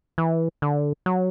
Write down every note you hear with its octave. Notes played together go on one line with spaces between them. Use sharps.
E3
D3
F#3